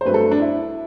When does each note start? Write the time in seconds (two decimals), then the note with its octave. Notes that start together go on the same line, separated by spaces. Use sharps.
0.01 C5
0.05 G2 F#3 A3 C4 B4
0.14 A4
0.31 D4
0.40 E4